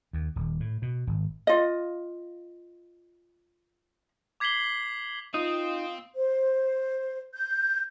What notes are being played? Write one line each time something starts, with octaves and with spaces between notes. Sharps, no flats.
D#2
D#1
A2
B2
G#1
F4 D#5
D6 G#6 B6 C7 F#7 G7
C4 D#4 F4 D#6
C5
G6